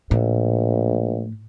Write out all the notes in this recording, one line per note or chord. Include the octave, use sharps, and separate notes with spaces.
A#1 A2